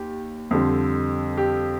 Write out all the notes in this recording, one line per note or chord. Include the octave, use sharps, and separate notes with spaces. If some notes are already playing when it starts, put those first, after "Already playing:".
Already playing: D#2 G4
F2 D3 G3 C4
G4